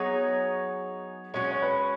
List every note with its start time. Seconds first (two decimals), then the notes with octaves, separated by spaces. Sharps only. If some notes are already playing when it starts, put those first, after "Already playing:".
Already playing: F#3 B3 D#4 G#4 C#5
1.34 G#3 C#4 F#4 C#5
1.51 C#5
1.62 B4